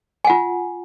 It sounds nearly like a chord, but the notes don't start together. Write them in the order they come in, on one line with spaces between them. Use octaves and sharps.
G#5 F#5 F4